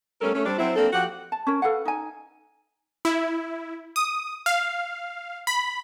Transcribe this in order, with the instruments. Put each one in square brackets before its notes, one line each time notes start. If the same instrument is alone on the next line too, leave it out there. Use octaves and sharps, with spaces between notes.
[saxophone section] G3 A3 B3 C#4 A4 A#4
A3 C#4
G3 C4 D4
F#3 C4 E4
A#3 C4 D4 A4
F3 F#4 G4 F#5
[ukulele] A5
C#4 A#4 C#5
A4 B4 F5 F#5
D#4 G#5
[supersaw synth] E4
D#6
F5
B5